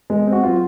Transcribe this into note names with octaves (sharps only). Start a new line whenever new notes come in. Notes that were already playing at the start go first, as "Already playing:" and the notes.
G#3
C4
F#4
F#3 F4